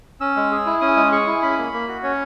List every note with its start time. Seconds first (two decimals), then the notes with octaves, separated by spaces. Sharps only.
0.20 C#4 E6
0.36 G#3
0.51 G#4
0.66 E4
0.81 C#4 D#6
0.97 G#3
1.12 G#4 C#6
1.27 E4
1.42 C#4 B5
1.58 A#3
1.73 A#3
1.88 F#4
2.03 C#4 C#5